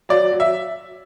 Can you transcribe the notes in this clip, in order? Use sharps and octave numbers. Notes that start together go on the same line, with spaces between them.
F#3 D5
F#3
E5